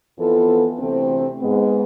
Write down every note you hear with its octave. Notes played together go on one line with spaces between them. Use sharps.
F2 E3 B3 F4 A4
D2 C3 E3 A3 C4
G#2 G#3 B3